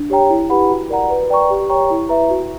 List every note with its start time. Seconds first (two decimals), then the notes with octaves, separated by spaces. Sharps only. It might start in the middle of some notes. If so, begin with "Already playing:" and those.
Already playing: D4
0.10 G4 C#5 G5 A#5
0.30 E4
0.50 G4 B4 F#5 B5
0.70 F#4
0.90 A#4 D5 F#5 A#5
1.10 B4
1.30 D5 G5 A#5 C#6
1.50 G4
1.70 C#5 G5 A#5 C#6
1.90 E4
2.09 B4 E5 A#5
2.30 F#4